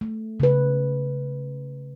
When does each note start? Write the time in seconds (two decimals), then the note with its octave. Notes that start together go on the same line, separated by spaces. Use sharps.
0.01 A3
0.40 C#3 B4